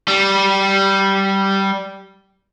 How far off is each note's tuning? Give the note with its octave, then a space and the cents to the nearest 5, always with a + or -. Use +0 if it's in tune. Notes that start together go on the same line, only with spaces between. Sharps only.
G3 -10